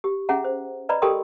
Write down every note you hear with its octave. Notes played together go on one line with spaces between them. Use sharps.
G4
C#4 G#4 E5 F#5 A#5
C5
B4 D5 D#5 A#5 B5
G4 A4 A#4 G5 C6 D#6